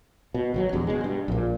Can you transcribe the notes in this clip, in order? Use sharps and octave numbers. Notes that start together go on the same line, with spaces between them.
B2
G#1 C3 F#3
D#1 E2 G2
B2 G#3
G2
A#1 A#2